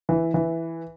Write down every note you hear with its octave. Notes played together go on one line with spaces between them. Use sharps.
E3
E3